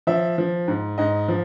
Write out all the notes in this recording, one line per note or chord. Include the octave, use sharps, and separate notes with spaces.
F3 E5
F3
G#2
G#2 D#5
F3